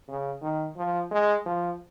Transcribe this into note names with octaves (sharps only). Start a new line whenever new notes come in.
C#3
D#3
F3
G#3
F3